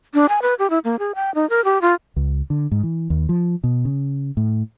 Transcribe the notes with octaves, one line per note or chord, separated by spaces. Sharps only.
D4
G#5
B4
G4
E4
A#3
G#4
G5
D#4
A#4
G4
F4
C#2
D3
G#2
E3
D#2
F3
B2
C#3
A2